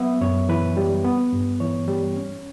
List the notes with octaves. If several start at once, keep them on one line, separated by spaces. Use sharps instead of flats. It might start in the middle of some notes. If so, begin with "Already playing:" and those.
Already playing: F#3 B3 E5
F#2 C#5
E3 B4
G3
B3
G2
E3 C#5
G3
C#4